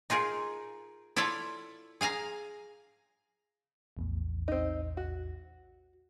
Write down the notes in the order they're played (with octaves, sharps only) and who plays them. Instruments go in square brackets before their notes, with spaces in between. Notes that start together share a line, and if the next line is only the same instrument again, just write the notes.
[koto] D#4 F4 G#4 A#4
E4 F4 A4 C#5 D5
G#4 F5 G#5 A#5
[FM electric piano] A#1 E2 A2
[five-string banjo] C4 D#4
F#4